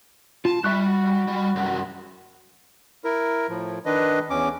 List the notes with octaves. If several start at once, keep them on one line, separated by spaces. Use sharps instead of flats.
F4 A5
G3 E5 C#6 F#6
F#4
G3
C2 F#2
E4 A#4
A2 F3
D#3 D4 B4 D#5
E2 C#4 D6